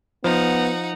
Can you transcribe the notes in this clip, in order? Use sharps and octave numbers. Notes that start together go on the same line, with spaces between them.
F3 B3 D#4 F#5